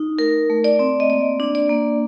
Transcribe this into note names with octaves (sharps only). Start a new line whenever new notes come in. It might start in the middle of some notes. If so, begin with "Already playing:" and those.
Already playing: D#4
A3 A#4
A3
D5
C4
D#5
A#3 D5
D4
D5
A#3